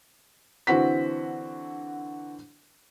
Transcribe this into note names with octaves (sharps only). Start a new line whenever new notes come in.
D3 E3 C4 F#4 B6